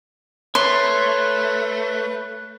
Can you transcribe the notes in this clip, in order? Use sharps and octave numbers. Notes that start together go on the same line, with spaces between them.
A3 B4 C#5 C6